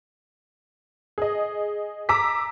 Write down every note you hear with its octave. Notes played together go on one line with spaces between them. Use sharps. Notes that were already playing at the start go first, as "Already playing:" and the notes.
G#4 D#5
A#5 D6 E6 B6